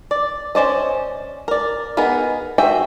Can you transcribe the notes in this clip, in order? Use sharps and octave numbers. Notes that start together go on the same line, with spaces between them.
D5
C#4 C5 D5 D#5
A#4 D5
B3 D#4 G#4 A#4 B4
F#4 G#4 E5 G5